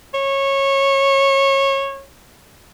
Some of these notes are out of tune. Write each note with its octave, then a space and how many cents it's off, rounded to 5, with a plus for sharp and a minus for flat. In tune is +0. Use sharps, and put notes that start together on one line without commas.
C#5 -20